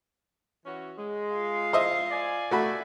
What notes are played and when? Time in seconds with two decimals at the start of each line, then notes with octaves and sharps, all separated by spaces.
0.65 E3 C#4 F#4
0.98 G#3
1.33 F4 F5
1.73 C5 D#5 E5
2.12 D5 G#5
2.51 A3 F#4 E5 B5